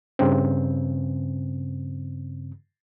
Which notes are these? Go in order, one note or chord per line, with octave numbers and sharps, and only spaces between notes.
G2 C#3 C4